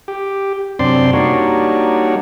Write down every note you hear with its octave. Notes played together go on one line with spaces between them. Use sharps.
G4
F#2 C3 C4 D4 D5 C6
G3 A#3 D4 D#4 F#4 C#5